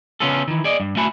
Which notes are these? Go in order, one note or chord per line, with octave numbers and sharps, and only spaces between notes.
C#3 B3 C#4 F4 G#4 A4
D#3 E3
G#4 D5 D#5
G2
A2 A3 F#4 G#5 A5 B5